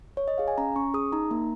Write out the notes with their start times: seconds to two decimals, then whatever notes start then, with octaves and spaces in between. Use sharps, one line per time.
0.17 C#5
0.28 D#5
0.38 G#4 F5
0.48 G#5
0.58 C#4 A#5
0.76 C#4 C#6
0.94 G#4 D#6
1.12 D#4 A#5
1.31 A#3